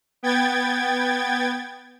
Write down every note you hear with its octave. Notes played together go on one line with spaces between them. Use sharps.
B3 G5 G#6 A6